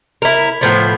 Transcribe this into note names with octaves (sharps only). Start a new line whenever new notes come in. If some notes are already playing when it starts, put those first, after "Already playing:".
E4 A#4
A2 F3 B3